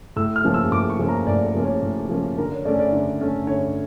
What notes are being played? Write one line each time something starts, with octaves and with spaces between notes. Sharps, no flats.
A2 E6
F6
F3 A#3 C#4
E6
A2 D6
C#6
F3 A#3 C#4
A#5
A2 D5
A#4
F3 A#3 C#4
C#5
A2
F3 A#3 C#4
D3 A#4
C#5
A3 C#4 D5
D5
D3
A3 C#4
D3 C#5